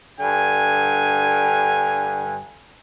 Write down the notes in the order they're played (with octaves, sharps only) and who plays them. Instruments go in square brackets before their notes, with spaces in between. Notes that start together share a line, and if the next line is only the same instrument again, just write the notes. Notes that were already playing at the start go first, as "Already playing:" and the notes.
[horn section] G2 D3 G#5